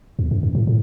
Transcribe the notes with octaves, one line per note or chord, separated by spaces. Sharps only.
E2
F#2
F#2
A2
A2